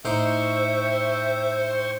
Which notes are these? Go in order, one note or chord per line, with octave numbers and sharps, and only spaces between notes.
A2 D#4 C5 E5 G5 C#6 D6